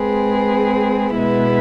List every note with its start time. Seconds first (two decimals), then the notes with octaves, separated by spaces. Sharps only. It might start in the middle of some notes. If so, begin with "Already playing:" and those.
Already playing: G#3 C4 G#4 B4
1.15 B2 G#3 B3 E4 B4